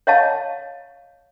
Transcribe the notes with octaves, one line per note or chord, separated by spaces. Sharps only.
C#5 D#5 F5 A5